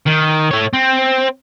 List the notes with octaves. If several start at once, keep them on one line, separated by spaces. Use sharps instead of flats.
D#3
A3 C#5
C4